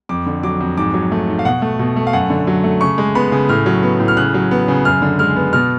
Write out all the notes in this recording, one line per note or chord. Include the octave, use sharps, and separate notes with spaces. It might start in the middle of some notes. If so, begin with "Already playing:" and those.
F2 D6
D3
F#3 D6
F2
G#2 D6
F#3
A3
G#2
F5
B2 F#5
A3
B2
A3
F5
F#2 F#5
D3
F#3
A3
C#3 C#6
G#3
B3 B5
C#3
A2 F6
F#3
B3
A2
F6
C#3 F#6
F#3
B3
C#3
F#2 F6
D3
G#3 F6
B3
B2 F6